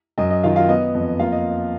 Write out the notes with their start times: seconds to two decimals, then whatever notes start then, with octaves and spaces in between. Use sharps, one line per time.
0.18 F#2 D#5
0.30 D#5
0.43 D#3 F4 F5
0.56 F4 F5
0.68 B3 D#5
0.94 F2
1.19 A#3 F4 F5
1.32 D#5